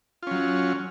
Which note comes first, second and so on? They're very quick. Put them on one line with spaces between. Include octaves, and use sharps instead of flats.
F4 C#4 F#3